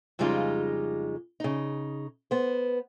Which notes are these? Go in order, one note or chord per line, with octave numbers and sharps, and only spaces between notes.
F2 C#3 G3 G#3 D#4 F4
C#3 D#4
B3 C5